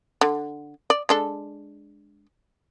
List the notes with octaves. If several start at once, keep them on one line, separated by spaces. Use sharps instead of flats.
D3
D5
G#3 D4 A4